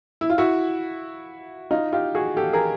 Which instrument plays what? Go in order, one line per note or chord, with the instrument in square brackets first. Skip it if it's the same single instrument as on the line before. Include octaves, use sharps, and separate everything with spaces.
[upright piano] E4
F4
E4 F#4
D#4 F4
F4 G4
F#4 G#4
G4 A4
G#4 A#4